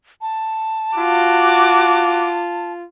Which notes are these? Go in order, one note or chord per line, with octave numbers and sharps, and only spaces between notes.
A5
F4 F#4 D6